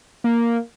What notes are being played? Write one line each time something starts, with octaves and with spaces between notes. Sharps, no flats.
A#3